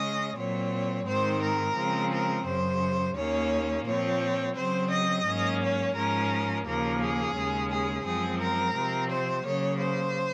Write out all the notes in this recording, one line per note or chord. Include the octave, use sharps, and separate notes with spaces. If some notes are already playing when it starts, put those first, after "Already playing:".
Already playing: C#3 G#3 C#4 D#5
A#2 F#3 C4 C#5
G#2 D#3 G#3 C4 C5
A#4
C#3 F3 G#3 C4
A#4
F#2 C#3 F#3 C5
D#2 D#3 A#3 C#4 C#5
A#2 F3 C4 C#5
C#3 F#3 C4 C5
D#5
G#2 F#3 A#3 C#4
C#5
G#2 F3 G#3 C#4 A#4
D#2 C#3 F3 A#3 A#4
G#4
D#2 C#3 G#3 C#4
G#4
F#2 F3 G#3 C4 G#4
A#4
C3 F3 C4
C5
C#3 F#3 A#3 C#5
C5